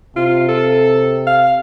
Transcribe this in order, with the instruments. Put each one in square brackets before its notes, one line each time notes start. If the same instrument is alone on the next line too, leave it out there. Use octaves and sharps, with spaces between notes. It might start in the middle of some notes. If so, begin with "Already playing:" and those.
[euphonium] C3 [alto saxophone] F4
[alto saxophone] A4
F5